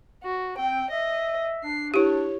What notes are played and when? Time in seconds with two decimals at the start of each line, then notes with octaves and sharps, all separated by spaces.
0.23 F#4
0.58 C4 G5
0.90 D#5 E5
1.64 D4 C7
1.94 E4 G4 C#5